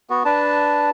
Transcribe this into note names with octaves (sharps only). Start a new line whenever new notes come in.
B3 F#4
D4 B4 A5